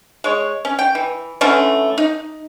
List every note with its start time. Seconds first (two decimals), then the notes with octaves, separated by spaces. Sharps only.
0.24 G#3 C#5
0.65 C#4
0.79 G5
0.95 E3
1.41 D3 E3 A3 C#4
1.98 D#4